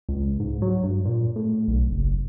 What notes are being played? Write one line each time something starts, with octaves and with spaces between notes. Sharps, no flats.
C#2
G#2
F#3
G2
A#2
A2
B1
F#1